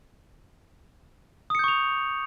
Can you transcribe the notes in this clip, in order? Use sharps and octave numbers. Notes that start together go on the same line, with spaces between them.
C#6 D#6 G6 C#7 F7